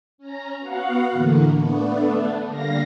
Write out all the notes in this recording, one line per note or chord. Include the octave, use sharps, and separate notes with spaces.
C#4 A#5
B3 F#4 F5 F#5
A2 D3 E3 A#3
A3 B3 D4
D3 G3 A#3 F5 A#6